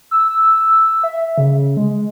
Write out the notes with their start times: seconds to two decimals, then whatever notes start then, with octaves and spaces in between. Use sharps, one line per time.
0.11 E6
1.03 E5
1.38 C#3
1.77 G#3